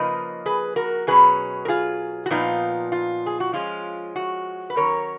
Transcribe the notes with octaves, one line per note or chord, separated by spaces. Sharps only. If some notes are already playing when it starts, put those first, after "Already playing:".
Already playing: C#3 F3 A#3 D#4 B4 D#5
G#4 B4
F#4 A#4
B2 F#3 C#4 G#4 B4
A#4
F4 G#4
F#4
A#2 F3 B3 D#4 F4
F4
G#4
F#4
F3 G#3 C#4 F4
F#4
B4
D#3 F#3 C#4 A#4 C#5